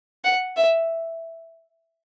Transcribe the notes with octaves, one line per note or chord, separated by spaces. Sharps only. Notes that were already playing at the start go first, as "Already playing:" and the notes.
F#5
E5